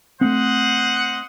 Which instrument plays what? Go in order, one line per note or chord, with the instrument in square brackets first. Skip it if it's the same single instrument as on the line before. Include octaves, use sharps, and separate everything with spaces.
[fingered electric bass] A3 B3 C4 [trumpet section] C5 D#5 F#5